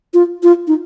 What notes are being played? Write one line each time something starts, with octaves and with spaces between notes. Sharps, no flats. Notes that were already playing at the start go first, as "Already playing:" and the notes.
F4
F4
D#4